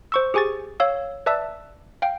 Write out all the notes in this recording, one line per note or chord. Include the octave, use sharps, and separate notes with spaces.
C5 C#6 E6
G4 G#4 G#5 C#6 A6
C#5 F5 E6
B4 D5 E5 A5 E6
F5 G5